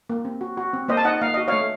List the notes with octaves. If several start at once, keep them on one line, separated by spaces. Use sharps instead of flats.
A#3
C4
F#4
F#4
C4
A#3 C5 D#5
A5
D#4 D#5 F#5
A#3 F5
F#4 D#5
A3 C#5 F5